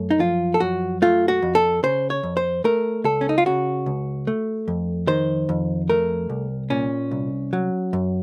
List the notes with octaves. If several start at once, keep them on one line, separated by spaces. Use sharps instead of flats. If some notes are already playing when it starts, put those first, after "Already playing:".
Already playing: F#2 A3
D#4
F3 F4
A4
F#2 F#4
A3 F4
F#4
F2
A4
C#3 C5
C#5
F2
C5
A3 A#4
C#2 A4
C#4
D#4
F4
C#3 F#4
C#2
A3
F2
D#3 C5
F2
A3 A#4
C2
A#2 C#4
C2
F#3
F#2